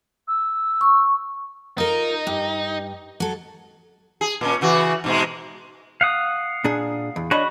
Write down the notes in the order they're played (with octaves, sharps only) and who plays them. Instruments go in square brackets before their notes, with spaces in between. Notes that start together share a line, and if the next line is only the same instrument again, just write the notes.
[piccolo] E6
[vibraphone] C#6
[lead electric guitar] D#4 [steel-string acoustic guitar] F4 A#4
[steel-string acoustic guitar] G2
F#3 A4
[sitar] G#4
A#2 C#4
C#3 E3 F#4
G#2 B2 G#3
[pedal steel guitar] F5 F#5 D#6
[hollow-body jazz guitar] A#2 D4 G#4
E2
[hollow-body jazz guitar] D4 C#5 D#5 [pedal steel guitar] F#4 B5